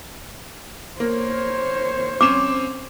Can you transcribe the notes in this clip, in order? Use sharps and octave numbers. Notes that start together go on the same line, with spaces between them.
A#3 C5 C#5
C4 C#4 D6 E7